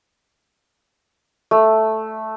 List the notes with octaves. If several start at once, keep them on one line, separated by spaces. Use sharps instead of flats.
A3